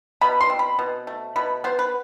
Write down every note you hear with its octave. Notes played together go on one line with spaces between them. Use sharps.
B2 B5
C6
C4
B5
B2
A3
B2 B5
B3 C5
B4